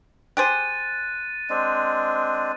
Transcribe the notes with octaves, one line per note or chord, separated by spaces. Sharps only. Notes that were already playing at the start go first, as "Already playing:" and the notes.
G4 G#4 C5 F#6 A6 D#7
G#3 C4 D4